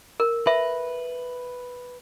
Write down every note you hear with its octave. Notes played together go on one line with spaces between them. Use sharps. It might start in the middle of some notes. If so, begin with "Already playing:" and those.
A#4
B4 E5